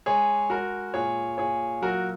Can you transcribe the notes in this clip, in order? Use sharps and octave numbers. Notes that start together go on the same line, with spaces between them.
G#3 G#4 C#5
G#3 F#4 A#4
A#2 G#4 C#5
A#2 G#4 C#5
F#3 F#4 A#4